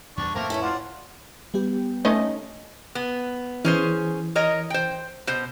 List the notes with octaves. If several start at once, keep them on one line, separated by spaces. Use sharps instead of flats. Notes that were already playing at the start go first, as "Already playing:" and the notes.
E2 G3 D4 C#6
F2 A2 A3 A#3 C4 A#4
C#4 E4 B4 C#5
F4 D5 F#5
G3 B3 G4
A3 C#4 D#4 D#5
B3
E3 C#4 G#4 C5
A#4 C#5 D#5
C5 G5
B2 C5